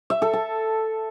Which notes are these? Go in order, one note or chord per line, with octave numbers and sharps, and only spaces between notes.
E5
A4
A5